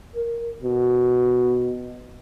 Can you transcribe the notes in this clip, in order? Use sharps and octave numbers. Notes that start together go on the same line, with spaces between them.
A#4
B2